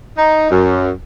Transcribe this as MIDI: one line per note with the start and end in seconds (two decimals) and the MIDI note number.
0.18 0.47 63
0.51 0.90 42